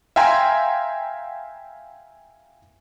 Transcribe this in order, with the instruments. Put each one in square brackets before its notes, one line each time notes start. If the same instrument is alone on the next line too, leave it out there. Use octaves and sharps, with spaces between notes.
[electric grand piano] E5 F5 G5 G#5 A#5 C6